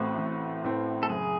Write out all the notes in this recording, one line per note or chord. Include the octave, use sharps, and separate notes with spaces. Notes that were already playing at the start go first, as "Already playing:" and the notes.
Already playing: A1 A2 E3 A3 C4 F#4
A1
A2 E3 A3 C4
A4
F#1 G#4